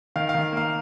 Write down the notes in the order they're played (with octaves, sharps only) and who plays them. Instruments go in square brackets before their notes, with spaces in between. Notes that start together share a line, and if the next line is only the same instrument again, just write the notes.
[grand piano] D#3 F5
F5
D#3
A#3 F5